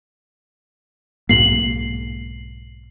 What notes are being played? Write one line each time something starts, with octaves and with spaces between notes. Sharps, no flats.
B1 G#2 A#3 C7 F#7